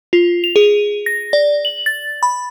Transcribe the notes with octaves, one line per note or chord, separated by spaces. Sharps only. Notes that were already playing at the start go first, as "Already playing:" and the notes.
F4
F7
G#4
A#6
D5
F#7
A6
B5